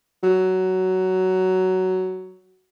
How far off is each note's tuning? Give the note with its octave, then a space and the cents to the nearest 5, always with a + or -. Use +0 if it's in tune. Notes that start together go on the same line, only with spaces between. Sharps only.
F#3 +10